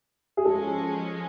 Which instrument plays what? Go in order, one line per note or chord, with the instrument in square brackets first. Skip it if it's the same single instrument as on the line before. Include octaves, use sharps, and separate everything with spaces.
[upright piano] G#4
[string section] F3 G#3 C#4 [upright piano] A4